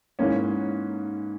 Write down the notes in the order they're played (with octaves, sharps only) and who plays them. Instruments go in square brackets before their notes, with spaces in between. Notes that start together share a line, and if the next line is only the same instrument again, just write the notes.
[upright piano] G#2 E3 A#3 C#4